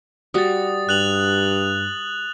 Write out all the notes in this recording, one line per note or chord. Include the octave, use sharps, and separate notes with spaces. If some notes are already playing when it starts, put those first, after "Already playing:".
G3 F#4 D#6 A6
G2 F#6 F7 F#7